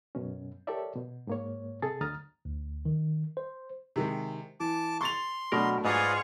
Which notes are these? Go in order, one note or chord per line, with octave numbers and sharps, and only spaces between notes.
F#2 B2 C#4
G4 A4 A#4 C#5 D5 E5
B2
G#2 A#3 C#5
C3 G#4 A4 A6
D2 D3 A#5 D#6 F6 A6
D2
D#3
C5
C3 D#3 G#3
E3 A5 D6
C6 C#6 A6 F7
B2 F#3 A3 D4 A#4
G#2 F4 G#4 B4 D5 D#5 C#6